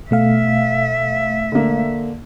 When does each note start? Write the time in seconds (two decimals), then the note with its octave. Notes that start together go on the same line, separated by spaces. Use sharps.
0.11 B2 A3 E5 F5
1.52 D3 A#3